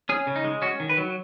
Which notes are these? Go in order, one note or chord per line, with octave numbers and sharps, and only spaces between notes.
C#4 G#4
C#3
D#4
G#3
C#4 F#4
D#3
B4
F#3